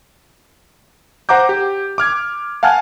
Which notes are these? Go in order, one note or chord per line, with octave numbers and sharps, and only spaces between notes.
C5 F#5 A#5 D6 G6
G4
D6 F6 G#6
F5 F#5 G#5 A5 F6